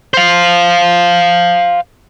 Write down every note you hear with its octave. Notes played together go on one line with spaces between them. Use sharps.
C5 F5